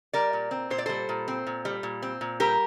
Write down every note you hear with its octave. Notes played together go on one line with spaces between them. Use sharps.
G3 A#4 D5
A#2
C4
A#2 C5
D5
G3 A4 C5
A#2
C4
A#2
G3
A#2
C4
A#2
G3 G4 A#4